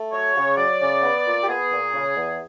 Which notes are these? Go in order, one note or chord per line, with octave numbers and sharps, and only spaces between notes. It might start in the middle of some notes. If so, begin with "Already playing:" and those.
Already playing: A3
F#3 C#5
C#3
F#3 D5
C#3
B3
A#2
G4
B3 G#4
A#2
C#3
E2